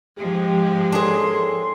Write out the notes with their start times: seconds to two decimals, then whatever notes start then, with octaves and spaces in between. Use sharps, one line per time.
0.18 G#2 F3 G#3 G4
0.92 D#2 D4 G#4 A4 C6